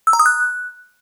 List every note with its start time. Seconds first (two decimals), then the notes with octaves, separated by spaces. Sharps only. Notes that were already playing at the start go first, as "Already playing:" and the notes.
0.07 E6
0.13 A#5
0.19 D#6
0.26 F#6